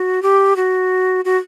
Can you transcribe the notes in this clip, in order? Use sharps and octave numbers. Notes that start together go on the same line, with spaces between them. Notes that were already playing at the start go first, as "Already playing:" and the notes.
Already playing: F#4
G4
F#4
F#4